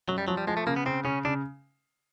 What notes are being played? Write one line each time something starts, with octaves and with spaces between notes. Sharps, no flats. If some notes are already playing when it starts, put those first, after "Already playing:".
F#2 F#3
G3
F3 F#3
G3
F3 G#3
A3
C#3 A#3
B3
C#3 C4
C#3 C#4
C#3 D4